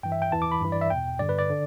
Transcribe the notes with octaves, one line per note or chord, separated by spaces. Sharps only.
G2 E3 G5
E5
G5
E2 E3 A5
D6
B5
G2 E3
D5
E5
E2 B2 G5
G2 D3 D5
B4
D5
D3